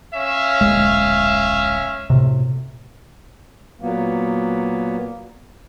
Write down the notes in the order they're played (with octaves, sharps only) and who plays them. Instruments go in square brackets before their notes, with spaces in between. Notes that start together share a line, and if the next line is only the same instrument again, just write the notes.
[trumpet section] C#4 E5 F5
[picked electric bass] D1 A#1 G#3
A2 C3
[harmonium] A#2 F#3 A#3 B3